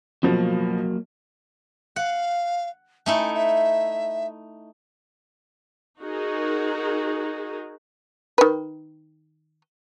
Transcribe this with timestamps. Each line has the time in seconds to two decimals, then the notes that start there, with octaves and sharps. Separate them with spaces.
0.23 B2 F3 F#3 A#3
1.96 F5 F#5
3.06 A3 D#4 E4 G#5
3.33 E5
6.01 D#4 F#4 G#4 A#4
8.38 D#3 B4